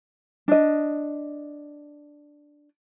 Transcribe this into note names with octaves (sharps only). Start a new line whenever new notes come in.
D4 D#5